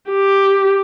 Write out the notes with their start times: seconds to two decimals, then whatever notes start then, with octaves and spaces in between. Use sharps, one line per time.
0.11 G4